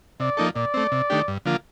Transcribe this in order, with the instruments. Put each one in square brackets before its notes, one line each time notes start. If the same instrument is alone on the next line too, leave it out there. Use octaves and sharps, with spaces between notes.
[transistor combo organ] C3 [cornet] D5
[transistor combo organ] F3 A#3 D#4 A4
[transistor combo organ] A#2 [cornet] D5
[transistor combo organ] A3 C4
C3
D#3 A3 D4 G4
G2
D3 F3 A#3 F4